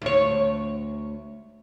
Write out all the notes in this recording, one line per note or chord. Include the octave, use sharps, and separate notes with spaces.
D2 C#5